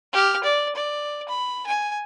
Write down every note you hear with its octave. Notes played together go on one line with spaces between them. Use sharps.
G4 F6
D5
D5
B5
G#5